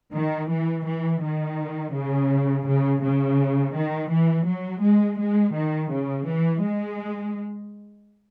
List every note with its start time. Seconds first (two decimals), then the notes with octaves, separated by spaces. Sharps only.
0.13 D#3
0.49 E3
0.85 E3
1.21 D#3
1.93 C#3
2.66 C#3
3.02 C#3
3.73 D#3
4.10 E3
4.46 F#3
4.82 G#3
5.18 G#3
5.54 D#3
5.90 C#3
6.26 E3
6.62 G#3